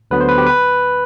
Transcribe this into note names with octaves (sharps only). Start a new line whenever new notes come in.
D2 D3 F#3 B3 B4
C5
B4
G4
B4